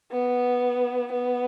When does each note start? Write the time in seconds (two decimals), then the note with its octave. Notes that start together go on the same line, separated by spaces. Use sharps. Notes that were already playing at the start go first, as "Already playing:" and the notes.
0.12 B3
1.12 B3